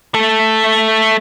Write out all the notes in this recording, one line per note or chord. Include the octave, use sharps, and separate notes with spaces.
A3 A4